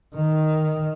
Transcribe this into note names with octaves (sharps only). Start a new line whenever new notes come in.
D#3